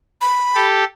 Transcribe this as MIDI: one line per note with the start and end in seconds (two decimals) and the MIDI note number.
0.21 0.66 83
0.55 0.84 67
0.55 0.84 69